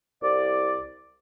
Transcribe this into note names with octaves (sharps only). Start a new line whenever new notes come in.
C2 D5